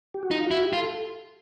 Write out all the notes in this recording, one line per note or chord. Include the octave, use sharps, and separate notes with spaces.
G4
F#4
D#4 F4
E4 F#4
G4
F4
A4